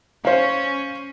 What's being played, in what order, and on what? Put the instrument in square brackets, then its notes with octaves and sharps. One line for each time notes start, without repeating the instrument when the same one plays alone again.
[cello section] C#4 [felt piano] C5 F5